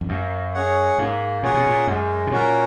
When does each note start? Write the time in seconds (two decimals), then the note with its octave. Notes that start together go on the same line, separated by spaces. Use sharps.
0.01 F2
0.09 F#2 A#3
0.54 C#4 G#4 C#5 F#5
0.98 G#2 A#3
1.43 A#2 C#4 G#4 C#5 F#5
1.54 B2
1.67 A#2
1.87 F#2 G#3
2.27 B2
2.31 A#2 C#4 F#4 A#4